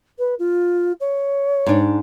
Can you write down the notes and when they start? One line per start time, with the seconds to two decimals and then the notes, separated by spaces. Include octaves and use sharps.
0.19 B4
0.39 F4
1.00 C#5
1.66 G#2 D4